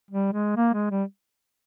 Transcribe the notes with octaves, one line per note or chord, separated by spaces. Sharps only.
G3
G#3
A#3
G#3
G3